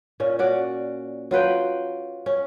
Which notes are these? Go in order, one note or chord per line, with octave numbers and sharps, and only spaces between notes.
A#2 C#4
C#4 F#4 D5
F#3 F4 B4 G5
C#4